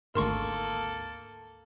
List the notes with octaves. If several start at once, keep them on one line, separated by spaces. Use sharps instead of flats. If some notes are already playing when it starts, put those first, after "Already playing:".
G#1 D2 G#2 A#3 A4 A#4 C6 C#6